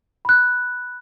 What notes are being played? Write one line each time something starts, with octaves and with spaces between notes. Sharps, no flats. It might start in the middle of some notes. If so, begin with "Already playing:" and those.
B5 F#6